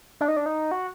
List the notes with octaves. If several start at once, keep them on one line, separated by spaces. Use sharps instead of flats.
D4
D#4
D4
D#4
F#4